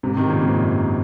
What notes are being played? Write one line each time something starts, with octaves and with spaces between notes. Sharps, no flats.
G#2 C3
C3 D#3
A#2 C#3
G#2 C3
F#2 A#2